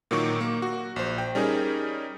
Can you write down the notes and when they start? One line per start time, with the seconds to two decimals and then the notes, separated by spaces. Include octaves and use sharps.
0.11 A#2 D#3 F#3 D#4 C#6 D6
0.41 A#3
0.62 F#4
0.96 A#1 C5
1.18 G5
1.35 G3 C#4 D#4 G#4 A#4